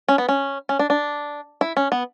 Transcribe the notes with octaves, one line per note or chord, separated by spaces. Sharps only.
C#4
B3
C#4
C#4
D4
D4
E4
C#4
B3